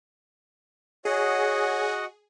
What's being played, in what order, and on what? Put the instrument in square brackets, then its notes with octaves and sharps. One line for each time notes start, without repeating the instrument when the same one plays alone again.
[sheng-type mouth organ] F#4 D#5 F#5 [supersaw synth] G#4 [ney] C#5